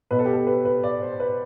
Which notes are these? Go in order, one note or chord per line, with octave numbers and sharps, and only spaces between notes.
B2 B4
A4
G4
A4
B4
B4
D5
C5
B4